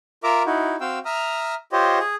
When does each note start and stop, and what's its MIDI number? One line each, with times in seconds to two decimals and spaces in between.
0.24 0.43 65
0.24 0.43 70
0.24 0.43 76
0.24 0.43 82
0.24 0.43 86
0.46 0.76 63
0.46 0.76 64
0.46 0.76 66
0.81 0.99 60
0.81 0.99 66
0.81 0.99 77
0.81 0.99 79
0.81 0.99 88
1.05 1.55 76
1.05 1.55 82
1.05 1.55 87
1.05 1.55 89
1.72 1.98 65
1.72 1.98 67
1.72 1.98 72
1.72 1.98 73
1.72 1.98 75
1.99 2.16 68